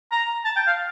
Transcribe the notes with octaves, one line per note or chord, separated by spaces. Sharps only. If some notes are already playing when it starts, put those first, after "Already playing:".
A#5
A5
G5
F5